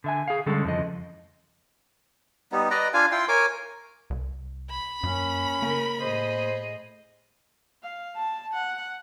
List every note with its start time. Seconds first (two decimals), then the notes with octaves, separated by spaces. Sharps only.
0.04 D3 E5 G#5
0.28 G#4 F5
0.46 D3 G3 G#3 C#4 A4
0.65 F2 C#3 E3 F3 D#5
2.52 G3 B3 D#4
2.71 B4 D5 D#5 A#5
2.94 D4 F4 F5 G#5
3.12 E4 F4 G5 C6
3.28 A#4 C#5 G#5 D6
4.10 C2
4.70 B5
5.03 F#2 A#3 C#4
5.62 C#3 A#3 A#4
6.01 A2 G#4 C5 D#5
7.83 F5
8.16 A5
8.53 F#5